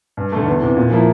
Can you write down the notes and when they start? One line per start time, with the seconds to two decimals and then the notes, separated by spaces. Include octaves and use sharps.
0.17 G2
0.32 D3 A3
0.47 E2
0.61 C3 E3
0.77 A#2
0.91 F3 A#3 E4